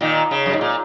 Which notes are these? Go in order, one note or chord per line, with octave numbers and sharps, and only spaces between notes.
A#2 D#3
C#3
F#2
G#2
A#2